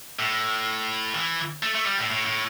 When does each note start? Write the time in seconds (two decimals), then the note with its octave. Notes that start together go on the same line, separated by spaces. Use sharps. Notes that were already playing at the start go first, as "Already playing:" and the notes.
0.19 A2
1.14 E3
1.63 A3
1.75 A3
1.86 G3
1.98 A2
2.10 A2
2.26 A2